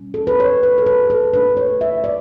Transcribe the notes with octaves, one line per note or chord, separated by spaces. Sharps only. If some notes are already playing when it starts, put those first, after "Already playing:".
Already playing: B2 G3 C#4
A4
B4
C#5
B4
A4
B4
A4
B2 A3 D4 B4
C#5
E5
D5